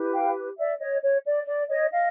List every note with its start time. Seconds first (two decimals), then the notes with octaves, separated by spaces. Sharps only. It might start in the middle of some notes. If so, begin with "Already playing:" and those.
Already playing: E4 G4 B4
0.13 F5 G5
0.57 D5 E5
0.79 C#5 D#5
1.02 C#5
1.25 D5
1.47 D5
1.69 C#5 D#5
1.90 D#5 F5